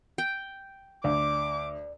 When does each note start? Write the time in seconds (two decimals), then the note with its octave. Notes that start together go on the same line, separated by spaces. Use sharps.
0.18 G5
1.04 D2 D5 D6